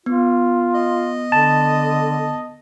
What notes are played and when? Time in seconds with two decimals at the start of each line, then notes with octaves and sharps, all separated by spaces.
0.06 B3 F4
0.74 D#5
1.32 D3 A5